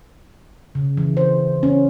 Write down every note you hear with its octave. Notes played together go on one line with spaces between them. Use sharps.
C#3
E3
C5
C#4